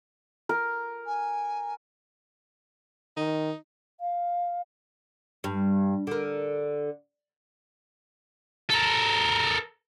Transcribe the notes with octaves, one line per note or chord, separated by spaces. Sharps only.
A#4
G#5
D#3 D#4
F5
G2
D3 A#4
A4 A#4